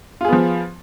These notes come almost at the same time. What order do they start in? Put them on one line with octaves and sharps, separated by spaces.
F4 G#4 B3 F3